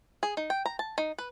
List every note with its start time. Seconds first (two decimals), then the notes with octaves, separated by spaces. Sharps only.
0.23 G#4
0.37 D#4
0.50 G5
0.66 A#5
0.79 A5
0.98 D#4
1.18 B4